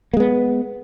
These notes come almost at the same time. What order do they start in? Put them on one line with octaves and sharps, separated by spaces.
A#3 G#3 B3